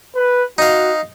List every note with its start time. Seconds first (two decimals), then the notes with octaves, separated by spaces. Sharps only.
0.16 B4
0.58 D#4 F#4 F5